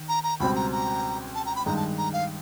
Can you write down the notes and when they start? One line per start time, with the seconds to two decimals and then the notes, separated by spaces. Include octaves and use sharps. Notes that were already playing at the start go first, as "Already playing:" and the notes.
Already playing: D#3
0.09 A#5
0.24 A#5
0.40 C#2 B2 G3 C4 B5
0.56 A#5
0.72 A#5
1.35 A5
1.46 A#5
1.56 B5
1.66 G2 D#3 G#3 A#5
1.76 A5
1.98 A#5
2.13 F5